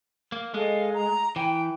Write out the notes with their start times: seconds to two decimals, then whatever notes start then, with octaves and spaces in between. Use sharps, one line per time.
0.32 A#3
0.54 G#3 A4 D#5 F5
0.95 A#5
1.36 E3 G5